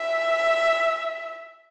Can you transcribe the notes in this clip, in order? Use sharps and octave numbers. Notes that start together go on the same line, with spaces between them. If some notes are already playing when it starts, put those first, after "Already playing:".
Already playing: E5